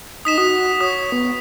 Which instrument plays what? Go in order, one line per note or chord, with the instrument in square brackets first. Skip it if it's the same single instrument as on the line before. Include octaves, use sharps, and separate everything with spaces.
[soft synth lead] D#4 [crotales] D#6 B6 E7
[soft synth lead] F#4 [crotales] D#6
[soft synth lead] C#5 [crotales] D#6
[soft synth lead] B3